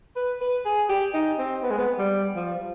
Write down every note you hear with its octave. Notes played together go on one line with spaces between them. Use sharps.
B4
B4
G#4
G4
D#4
C4
B3
G#3
B3
G3
F3